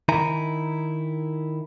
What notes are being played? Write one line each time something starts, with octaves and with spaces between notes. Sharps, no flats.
D#3 D#4 E4 G#5 A#5